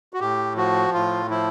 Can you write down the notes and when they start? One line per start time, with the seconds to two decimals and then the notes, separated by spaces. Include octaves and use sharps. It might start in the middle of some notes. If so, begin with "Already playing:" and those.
0.13 F#4
0.20 A2 G4
0.56 F3 F#4
0.94 A2 F4
1.30 F3 E4